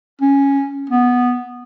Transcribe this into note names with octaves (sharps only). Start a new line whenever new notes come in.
C#4
B3